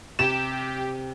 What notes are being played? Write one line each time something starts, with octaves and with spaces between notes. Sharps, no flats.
C3 G4 E7